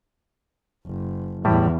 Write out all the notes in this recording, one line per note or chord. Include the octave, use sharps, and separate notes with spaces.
F#1
E2 A2 E3 G3 E4